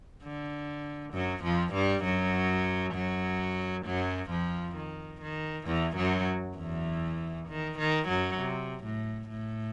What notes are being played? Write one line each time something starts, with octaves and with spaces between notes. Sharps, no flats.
D3
F#2 F#3
F2 F3
G2 G3
F#2 F#3
F#2 F#3
F#2 F#3
F2 F3
D#3
D#3
E2 E3
F#2 F#3
E2 E3
D#3
D#3
F#2 F#3
C3
A2
A2